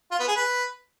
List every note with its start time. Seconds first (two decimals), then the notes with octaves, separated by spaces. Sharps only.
0.11 F4
0.20 B3
0.28 G#4
0.36 B4